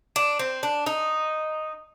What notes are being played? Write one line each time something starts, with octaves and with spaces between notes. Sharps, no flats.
D4
C4
D4
D#4